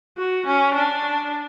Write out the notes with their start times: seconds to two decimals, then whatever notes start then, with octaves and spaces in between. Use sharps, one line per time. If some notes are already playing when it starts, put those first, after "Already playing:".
0.18 F#4
0.46 C#4
0.74 D4